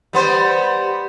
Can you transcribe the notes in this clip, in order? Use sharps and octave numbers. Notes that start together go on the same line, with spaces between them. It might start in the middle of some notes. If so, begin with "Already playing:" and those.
G3 B3 C5